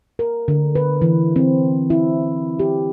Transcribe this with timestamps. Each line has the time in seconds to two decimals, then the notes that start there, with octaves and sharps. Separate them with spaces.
0.19 A#4
0.48 D3
0.75 B4
1.02 E3
1.36 C4
1.90 E4
2.59 G4